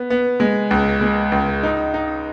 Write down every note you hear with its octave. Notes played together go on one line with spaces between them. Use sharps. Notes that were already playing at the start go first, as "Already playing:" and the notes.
Already playing: B3
B3
G#3
C#2
G#3
C#2
D#4
D#4